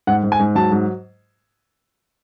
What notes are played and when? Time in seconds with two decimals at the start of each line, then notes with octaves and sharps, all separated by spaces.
0.07 G#2 F#5
0.23 G#2
0.32 G#5
0.39 G#2
0.55 F#3 A5
0.72 G#2